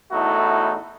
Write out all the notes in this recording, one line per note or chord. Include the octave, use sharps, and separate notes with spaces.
E2 A2 A3 D#4 E4 F#4